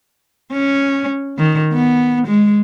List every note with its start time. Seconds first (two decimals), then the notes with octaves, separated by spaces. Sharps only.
0.53 C#4
1.39 D#3
1.73 B3
2.27 G#3